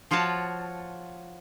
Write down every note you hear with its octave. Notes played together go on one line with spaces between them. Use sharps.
F3 F4 F#4 C#5 A5